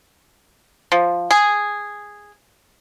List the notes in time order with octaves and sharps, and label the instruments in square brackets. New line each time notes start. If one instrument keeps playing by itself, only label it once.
[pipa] F3
G#4